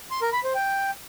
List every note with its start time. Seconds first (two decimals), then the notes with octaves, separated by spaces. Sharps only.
0.11 C6
0.22 A#4
0.33 B5
0.44 C5
0.55 G5